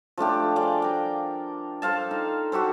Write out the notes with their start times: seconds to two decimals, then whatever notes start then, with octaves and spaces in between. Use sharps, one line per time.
0.18 F3 A3 D4 G4
0.56 G#4 D5 F5 G5
0.82 A#4 G5
1.82 A4 C5 F5 A5
2.11 D#4
2.52 F#4 G4 A4 C5